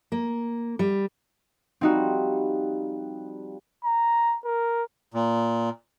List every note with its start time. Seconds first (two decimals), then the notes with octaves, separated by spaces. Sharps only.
0.12 A#3
0.79 G3
1.81 F3 G3 C4 D#4 F#4
3.84 A#5
4.45 A#4
5.14 A#2